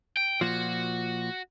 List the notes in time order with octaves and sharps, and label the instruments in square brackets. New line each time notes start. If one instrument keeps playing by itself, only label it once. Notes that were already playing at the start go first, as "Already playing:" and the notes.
[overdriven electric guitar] G5
[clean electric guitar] A#2 F3 [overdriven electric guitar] F#4